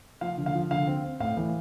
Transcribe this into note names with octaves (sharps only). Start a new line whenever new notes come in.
F3 F5
D3
F5
F3
D3 F5
C4
C4
A2 F5
E3